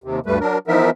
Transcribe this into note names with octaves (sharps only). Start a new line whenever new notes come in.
D#2 C3
D2 G2 G3 A3 B4
F#3 D4 A#4
E3 F3 B3 D#4 A#4 E5